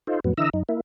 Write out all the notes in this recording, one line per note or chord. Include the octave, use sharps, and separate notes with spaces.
D#4 F4 A4 C5
F2 A2 F#3 B3
D3 E3 D#5 E5 A#5 E6
F#2 D#4
A#3 E4